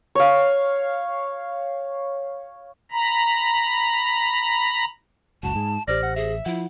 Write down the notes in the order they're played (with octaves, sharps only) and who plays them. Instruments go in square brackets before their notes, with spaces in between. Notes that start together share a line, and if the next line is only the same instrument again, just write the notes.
[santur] C#5 F5
[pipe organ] A#5 B5
[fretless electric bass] F#1 C#2 [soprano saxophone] F#4 [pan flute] A5
[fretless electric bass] G#2 [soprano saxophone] G#4
[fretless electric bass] A1 [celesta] G4 C5 A#6 [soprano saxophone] D5 [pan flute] F6
[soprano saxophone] F#5
[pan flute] G#4 [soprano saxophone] E5
[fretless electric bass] F3 [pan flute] E4 [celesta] F#5